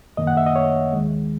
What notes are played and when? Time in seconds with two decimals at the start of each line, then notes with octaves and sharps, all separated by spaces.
0.17 F#2 D#3 A#3 D#5
0.27 F#5
0.37 E5
0.46 D#5
0.56 C#5
0.93 D#2 D#3 G#3